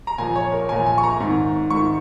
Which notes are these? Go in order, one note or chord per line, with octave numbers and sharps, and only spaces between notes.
A#5
A#2 F3 G#5
C#5
A#4
A#2 F3 G#5
G#5
C#6
A#5
G#2 D#3
G#2 D#3 C#6